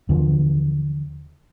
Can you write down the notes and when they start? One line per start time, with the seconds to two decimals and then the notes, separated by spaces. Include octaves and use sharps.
0.09 D#2 D3 E3 F3